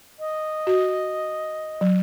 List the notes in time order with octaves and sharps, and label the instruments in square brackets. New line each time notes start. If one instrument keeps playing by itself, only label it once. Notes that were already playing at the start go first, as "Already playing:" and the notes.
[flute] D#5
[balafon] F#4
F#3